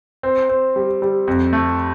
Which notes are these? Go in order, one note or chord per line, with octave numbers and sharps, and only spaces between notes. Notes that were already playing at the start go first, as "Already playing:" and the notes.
C4
C4
G3
G3
F2
A3